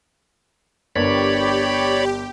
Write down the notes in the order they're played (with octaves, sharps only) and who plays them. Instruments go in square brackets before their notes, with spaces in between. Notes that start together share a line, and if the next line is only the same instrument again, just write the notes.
[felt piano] G1 D4 A#4 [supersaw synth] G4 [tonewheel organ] C#5 D5 B5